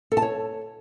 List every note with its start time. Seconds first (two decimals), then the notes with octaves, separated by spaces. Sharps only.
0.12 A4
0.17 A5
0.22 C#5